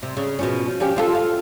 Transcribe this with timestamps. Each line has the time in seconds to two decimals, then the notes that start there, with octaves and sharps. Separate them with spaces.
0.03 C3
0.17 C#3
0.39 B2 F3 C#4
0.80 F3 C#4 G4
0.96 F3 F4 A4
1.15 F5